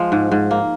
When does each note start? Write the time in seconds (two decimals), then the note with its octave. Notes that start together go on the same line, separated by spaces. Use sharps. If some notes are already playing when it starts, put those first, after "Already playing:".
Already playing: F3 G#3
0.12 G#2
0.32 G#2
0.51 A#3